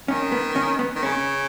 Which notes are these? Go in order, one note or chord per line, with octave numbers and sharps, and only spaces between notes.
D#3 C#4
B3
C#4
B3
D#3
C#3 C#4